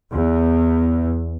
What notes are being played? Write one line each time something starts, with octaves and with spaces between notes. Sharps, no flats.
E2